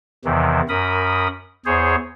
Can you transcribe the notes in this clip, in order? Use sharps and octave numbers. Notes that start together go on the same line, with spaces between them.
E2 C3 D#3 E3
F#2 A#4 B5 D#6
E2 G#4 C5 C#5